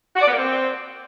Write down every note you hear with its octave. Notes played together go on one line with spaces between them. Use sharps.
F#4
D5
B3
A#3
C4